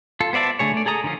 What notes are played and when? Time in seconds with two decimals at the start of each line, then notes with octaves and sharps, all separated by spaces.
0.20 F4 A4
0.33 B3 C5 D5 E5 A5
0.59 D3 A3 G#4 C#5
0.74 A3 D5
0.86 G#4 A4 A#5 D#6
1.04 D3 D#3 F3 C#4 F4